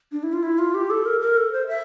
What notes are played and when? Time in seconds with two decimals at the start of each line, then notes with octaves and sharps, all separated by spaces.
0.12 D4
0.23 E4
0.33 F4
0.43 E4
0.59 F4
0.74 G4
0.90 A4
1.06 A#4
1.21 A#4
1.37 A4
1.52 C5
1.68 E5